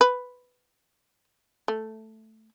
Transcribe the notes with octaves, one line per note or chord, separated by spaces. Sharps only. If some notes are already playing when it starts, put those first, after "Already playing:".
B4
A3